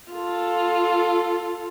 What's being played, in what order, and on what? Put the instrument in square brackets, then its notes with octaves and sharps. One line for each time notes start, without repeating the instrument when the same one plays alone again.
[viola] F4 A4